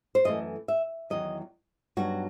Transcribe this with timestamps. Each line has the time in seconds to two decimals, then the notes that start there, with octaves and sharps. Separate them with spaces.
0.15 C5
0.25 F#2 E3 A3 D#5
0.68 E5
1.10 E2 D#3 F#3 D#5
1.97 G2 F#3 B3 D#4 F#4